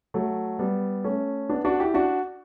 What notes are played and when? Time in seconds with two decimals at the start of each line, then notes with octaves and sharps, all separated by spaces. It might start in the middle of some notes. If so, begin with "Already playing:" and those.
0.14 F#3 A3
0.59 G3 B3
1.04 A3 C#4
1.50 B3 D4
1.65 D4 F#4
1.80 E4 G4
1.94 D4 F#4